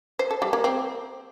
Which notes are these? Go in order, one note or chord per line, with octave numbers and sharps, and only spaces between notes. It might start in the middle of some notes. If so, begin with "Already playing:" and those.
C5
A4
G3
A#3
C4